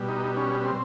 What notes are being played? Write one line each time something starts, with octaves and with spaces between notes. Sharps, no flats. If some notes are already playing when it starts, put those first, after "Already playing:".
Already playing: B2 G3
D#4
C#4
C4